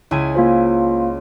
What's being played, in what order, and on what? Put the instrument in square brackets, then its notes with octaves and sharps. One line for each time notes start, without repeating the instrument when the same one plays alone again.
[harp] C#2 E4 G#5
[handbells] A#3 F4 C5